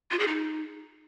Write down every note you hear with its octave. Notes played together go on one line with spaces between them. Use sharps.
F4
G#4
D#4